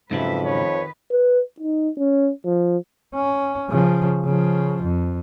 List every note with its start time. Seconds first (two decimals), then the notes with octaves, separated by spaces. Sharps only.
0.11 F2 G#2 C#3 F#3 B4 E5
0.46 D#3 B4 C#5
1.11 B4
1.60 D#4
1.98 C#4
2.45 F3
3.15 C#4
3.70 C#3 F3
4.26 C#3 F3
4.84 F2